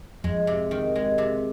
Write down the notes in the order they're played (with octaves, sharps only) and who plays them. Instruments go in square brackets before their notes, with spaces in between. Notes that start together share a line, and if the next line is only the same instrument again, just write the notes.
[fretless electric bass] F2 [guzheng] G#3
[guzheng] C3
D#3
G#3
C3